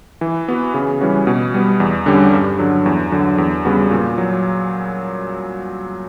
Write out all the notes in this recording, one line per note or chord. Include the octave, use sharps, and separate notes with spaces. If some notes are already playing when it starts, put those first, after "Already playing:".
E3
B3 F#4
C#3
E3 G3 C#4 F#4
B2
G3 B3
E2
D3 G3 C#4 G4
G2
D3 F#3
E2
D3 F#3
E2
C#3 G3 B3 F#4
A#2
F#3